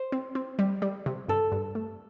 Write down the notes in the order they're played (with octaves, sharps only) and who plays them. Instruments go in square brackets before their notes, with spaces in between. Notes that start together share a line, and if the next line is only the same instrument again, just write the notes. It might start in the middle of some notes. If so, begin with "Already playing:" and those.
Already playing: [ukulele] C5
[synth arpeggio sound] C4
C4
G3
G3
C3
[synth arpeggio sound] G2 [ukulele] A4
[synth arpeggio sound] G2
A3